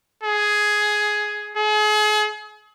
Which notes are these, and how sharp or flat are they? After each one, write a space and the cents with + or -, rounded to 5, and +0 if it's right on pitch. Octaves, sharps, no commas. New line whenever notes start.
G#4 +10
G#4 +40